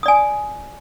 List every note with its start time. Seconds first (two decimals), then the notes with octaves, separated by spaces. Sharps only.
0.03 D#6
0.06 D5
0.08 G#5